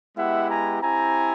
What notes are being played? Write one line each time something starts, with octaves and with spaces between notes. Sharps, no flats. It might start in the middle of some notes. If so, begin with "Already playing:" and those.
G#3 B3 E4 G4 E5 F#5
G#5 A#5
C4 E4 G4 G#5 A#5